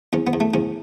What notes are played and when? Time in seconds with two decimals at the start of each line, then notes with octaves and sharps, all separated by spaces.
0.13 E2 C#4
0.27 B3
0.33 E2
0.40 A3
0.54 E2 C#4